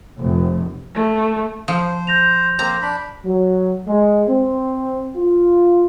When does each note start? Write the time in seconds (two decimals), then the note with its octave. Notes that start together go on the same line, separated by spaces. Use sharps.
0.20 F1
0.95 A3
1.68 F3 C5
2.07 G6 A#6 F7
2.59 A#3 C4 C5 A#5
2.82 D4 B5
3.24 F#3
3.87 G#3
4.28 C4
5.16 F4